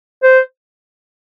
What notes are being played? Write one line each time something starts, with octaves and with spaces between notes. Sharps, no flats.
C5